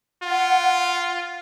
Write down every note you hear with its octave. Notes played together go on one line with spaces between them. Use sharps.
F4 F#5